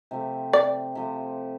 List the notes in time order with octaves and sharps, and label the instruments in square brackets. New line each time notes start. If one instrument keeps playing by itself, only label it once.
[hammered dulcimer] C3 F3 A3
[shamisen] D5
[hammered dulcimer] C3 F3 A3